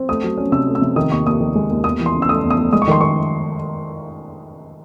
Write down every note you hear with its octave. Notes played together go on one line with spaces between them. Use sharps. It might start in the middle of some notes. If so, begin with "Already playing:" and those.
Already playing: C4
A3 D#6
F#3
C#4
C3 E6
A3
E6
C3
D#3 D#6
D#2 C#6
D#2 D#6
D#3
G#3
D#2
E2 D#6
E3
C6
C#3
E6
A3 D#6
E2
D#6
A3
G#3 D#6
C#6
D#3 C6
D#3 C#6